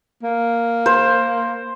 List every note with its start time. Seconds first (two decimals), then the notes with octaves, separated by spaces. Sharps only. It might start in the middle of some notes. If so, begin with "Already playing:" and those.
0.23 A#3
0.86 C5